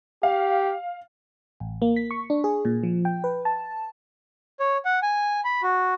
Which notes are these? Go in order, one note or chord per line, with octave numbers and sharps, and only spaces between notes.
G4 F5
A1
A#3
B6
C#6
D4
G#4
A#2
F3
G5
B4
A5
C#5
F#5
G#5
B5
F#4